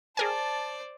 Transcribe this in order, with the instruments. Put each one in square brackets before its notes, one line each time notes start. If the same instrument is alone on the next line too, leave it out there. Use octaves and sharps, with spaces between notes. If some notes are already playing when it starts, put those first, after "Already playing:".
[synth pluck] G#4 A#4 G#5 [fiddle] C5 D5 [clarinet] A5